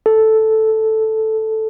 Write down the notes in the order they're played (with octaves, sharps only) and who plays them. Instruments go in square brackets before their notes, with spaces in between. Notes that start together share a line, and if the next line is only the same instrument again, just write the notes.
[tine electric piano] A4